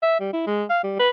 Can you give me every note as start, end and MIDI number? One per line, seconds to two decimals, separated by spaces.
0.02 0.19 76
0.20 0.32 55
0.33 0.45 64
0.47 0.64 56
0.70 0.79 77
0.83 0.98 55
0.99 1.10 71